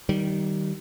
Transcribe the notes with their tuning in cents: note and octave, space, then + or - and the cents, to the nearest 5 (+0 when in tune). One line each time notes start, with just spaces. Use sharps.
D#3 +0 G3 -25